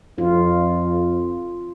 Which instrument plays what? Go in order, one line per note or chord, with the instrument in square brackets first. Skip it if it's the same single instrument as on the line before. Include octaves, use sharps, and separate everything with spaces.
[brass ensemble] F2 [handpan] F4